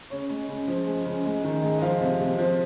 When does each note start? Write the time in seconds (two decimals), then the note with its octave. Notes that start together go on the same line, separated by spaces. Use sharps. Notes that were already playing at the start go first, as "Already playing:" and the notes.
0.10 C#3 C#5
0.30 G#3
0.48 C#3
0.67 F3
0.86 G#3
1.05 C#3
1.25 G#3
1.44 D#3
1.62 G#3
1.78 D#5
1.82 F3 F5
2.01 C3
2.20 C3
2.38 F3